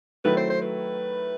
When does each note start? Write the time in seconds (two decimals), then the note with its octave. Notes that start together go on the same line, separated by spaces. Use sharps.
0.24 D#3 F#3 A3 E4 B4
0.37 C5
0.50 C5
0.61 B4